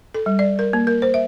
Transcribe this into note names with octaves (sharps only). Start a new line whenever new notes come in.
A4
G3
D5
A#4
A#3
A#4
C5
E5